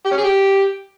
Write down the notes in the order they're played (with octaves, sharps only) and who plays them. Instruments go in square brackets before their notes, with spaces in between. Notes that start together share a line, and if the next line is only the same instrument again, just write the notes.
[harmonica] G4
C#4
G#4
G4